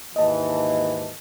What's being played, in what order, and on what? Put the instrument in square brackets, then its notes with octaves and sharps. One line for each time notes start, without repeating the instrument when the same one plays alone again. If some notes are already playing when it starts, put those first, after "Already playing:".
[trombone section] D#2 G#2 E3 [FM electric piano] D#5 A5